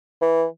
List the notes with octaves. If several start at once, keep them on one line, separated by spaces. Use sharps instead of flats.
E3